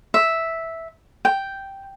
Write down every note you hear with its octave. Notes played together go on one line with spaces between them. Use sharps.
E5
G5